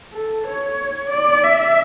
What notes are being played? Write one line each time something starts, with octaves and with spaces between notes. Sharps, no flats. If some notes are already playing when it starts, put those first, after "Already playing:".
A4
C#5
D5
E5